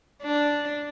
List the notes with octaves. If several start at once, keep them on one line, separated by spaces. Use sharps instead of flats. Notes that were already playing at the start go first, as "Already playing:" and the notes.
D4